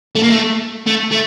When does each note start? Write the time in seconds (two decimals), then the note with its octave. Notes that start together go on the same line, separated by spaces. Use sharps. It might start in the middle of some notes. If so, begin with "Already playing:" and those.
0.15 A3
0.23 A#3
0.30 A3
0.87 A3
1.12 A3